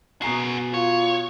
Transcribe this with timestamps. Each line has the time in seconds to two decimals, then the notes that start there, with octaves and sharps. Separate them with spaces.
0.22 B2 F#4 G#4 A#5 C7
0.74 F4 C#5